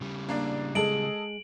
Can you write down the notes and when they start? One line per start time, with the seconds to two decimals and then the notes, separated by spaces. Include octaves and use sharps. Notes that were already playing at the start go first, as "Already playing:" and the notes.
0.01 C#3 G3
0.29 A#3 D4 D5
0.75 G#3 G#4 A4 D#5 D7 F#7